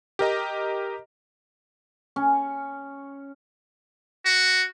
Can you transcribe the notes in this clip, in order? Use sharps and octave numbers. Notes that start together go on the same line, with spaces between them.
G4 A#4 D#5 A#5
C#4
F#4